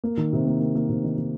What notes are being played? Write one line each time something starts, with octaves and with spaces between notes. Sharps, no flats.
A#3
D#3
C3
A#3
A#3
A#3
C3
D#3
D#3